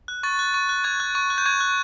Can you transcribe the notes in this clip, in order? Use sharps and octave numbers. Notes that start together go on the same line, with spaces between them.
F#6
C#6 A6
F#6
C#6
F#6
C#6 G#6
F#6
C#6
F#6
G6
C#6 G#6
F#6